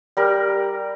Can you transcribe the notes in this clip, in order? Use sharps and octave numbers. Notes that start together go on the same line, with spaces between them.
G3 A#4